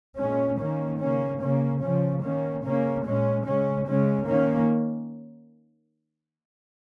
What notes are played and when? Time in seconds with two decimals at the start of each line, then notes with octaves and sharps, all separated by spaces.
0.18 A#2 G#3 C#4
0.59 D#3 A#3 C#4
1.00 C#3 A#3 C#4
1.41 C#3 A#3 C#4
1.82 C#3 F3 C#4
2.22 D#3 A#3 C#4
2.64 C#3 A#3 C#4
3.05 A#2 G#3 C#4
3.46 C#3 G#3 C#4
3.87 C#3 G#3 C#4
4.27 D#3 A#3 C#4